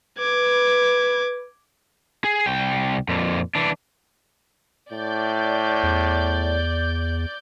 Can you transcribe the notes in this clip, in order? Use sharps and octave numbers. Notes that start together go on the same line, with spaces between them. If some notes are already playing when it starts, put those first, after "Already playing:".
B4 D6 G#6
G#4
C2 G5
F2 A#2
E3 D4
A2 D5 G6
E2